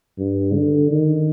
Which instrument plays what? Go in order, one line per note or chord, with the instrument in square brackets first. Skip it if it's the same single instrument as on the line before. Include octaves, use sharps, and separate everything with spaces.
[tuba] G2
D3
D#3